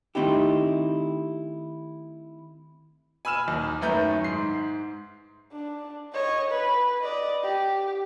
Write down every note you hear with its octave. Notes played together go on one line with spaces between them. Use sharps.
D#3 A3 C4 D#4 E4 G4
G#5 B5 E6 F6 E7
D#2
F#2 D#3 A3 B4 A#5 G6
G#2 C7
D4
C#5 D#5
B4
D5 D#5
G4